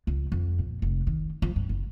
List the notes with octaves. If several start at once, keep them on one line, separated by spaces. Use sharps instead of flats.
C#2
F2
A#2
F1
D#3
F3
G2
F#1